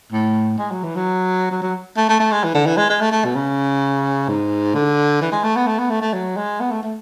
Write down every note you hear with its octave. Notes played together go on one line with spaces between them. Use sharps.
A2
G#3
F#3
E3
F#3
F#3
F#3
A3
A3
A3
G#3
E3
D3
E3
G#3
G#3
A3
A3
B2
C#3
G#2
D3
E3
G#3
A3
B3
A3
B3
A3
A3
F#3
G#3
B3
A3
A3